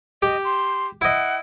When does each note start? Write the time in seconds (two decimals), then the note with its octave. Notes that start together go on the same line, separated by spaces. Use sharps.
0.22 G4 D#5
0.45 C6
1.01 E4 D#5 F#5